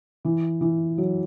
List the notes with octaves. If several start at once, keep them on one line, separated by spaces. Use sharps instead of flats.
E3
E3
F#3